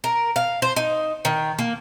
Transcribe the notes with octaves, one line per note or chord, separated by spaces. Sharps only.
A#4
F5
C5
D#4
D#3
A#3